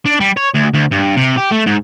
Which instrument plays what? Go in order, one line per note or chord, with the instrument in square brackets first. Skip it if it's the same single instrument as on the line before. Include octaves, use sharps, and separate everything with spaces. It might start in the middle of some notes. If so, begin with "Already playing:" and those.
[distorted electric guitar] D4
G3
C#5
D2
D2
G2
C3
G4
A3
G#2